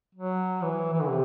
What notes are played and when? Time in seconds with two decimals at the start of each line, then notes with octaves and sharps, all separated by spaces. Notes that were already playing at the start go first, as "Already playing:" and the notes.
0.15 F#3
0.62 E3
0.93 E3
1.01 D3
1.09 C3